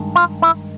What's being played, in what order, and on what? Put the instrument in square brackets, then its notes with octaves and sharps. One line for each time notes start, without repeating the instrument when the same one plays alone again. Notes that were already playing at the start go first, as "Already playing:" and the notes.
Already playing: [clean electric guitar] G2 D#3 G#3
F4
E4